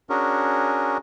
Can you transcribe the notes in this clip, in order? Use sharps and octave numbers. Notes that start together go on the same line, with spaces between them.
C#4 D4 F#4 G#4 A#4